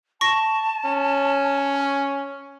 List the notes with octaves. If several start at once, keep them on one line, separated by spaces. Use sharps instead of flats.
A5 C#6 A#6
C#4